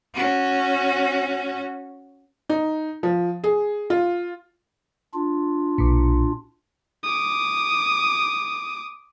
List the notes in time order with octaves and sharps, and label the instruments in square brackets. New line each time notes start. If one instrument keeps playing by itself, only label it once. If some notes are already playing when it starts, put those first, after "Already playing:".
[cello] C#4 F#4
[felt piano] D#4
F3
G#4
F4
[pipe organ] D4 F4
[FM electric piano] B1 A#2
[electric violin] D6 D#6